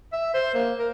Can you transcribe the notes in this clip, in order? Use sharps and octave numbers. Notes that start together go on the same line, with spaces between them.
E5
C5
A#3
A#4